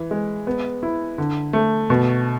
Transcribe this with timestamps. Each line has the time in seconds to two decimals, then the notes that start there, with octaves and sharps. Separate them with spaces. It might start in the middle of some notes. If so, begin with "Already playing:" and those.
Already playing: E3
0.11 G#3
0.47 B3
0.83 E4
1.18 D3
1.53 A3
1.90 B2